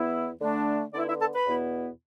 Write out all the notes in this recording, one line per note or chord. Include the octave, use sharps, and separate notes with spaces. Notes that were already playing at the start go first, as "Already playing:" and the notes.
Already playing: E2 E3 B3 E4
D3 A3 D4
D3 B3 D4 E4 D5
E4 E5
A4 A5
B4 B5
E2 B2 B3 E4